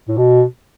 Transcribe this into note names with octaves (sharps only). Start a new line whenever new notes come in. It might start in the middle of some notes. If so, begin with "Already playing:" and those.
A2
B2